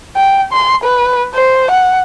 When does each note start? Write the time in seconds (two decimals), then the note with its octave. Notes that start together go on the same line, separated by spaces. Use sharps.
0.16 G5
0.53 C6
0.83 B4
1.34 C5
1.71 F#5